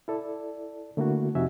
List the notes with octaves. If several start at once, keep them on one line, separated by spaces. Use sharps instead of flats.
E4 A4 D5
D3 A3 A#3 E4 F#4
F2 C3 D#4 F#4 E5 G#5